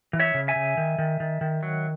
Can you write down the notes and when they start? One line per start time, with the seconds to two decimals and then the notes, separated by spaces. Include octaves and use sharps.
0.13 E3
0.20 C#5 E5
0.34 C#3
0.48 E5 G#5
0.56 C#3
0.77 D#3
0.98 D#3
1.20 D#3
1.41 D#3
1.63 F#3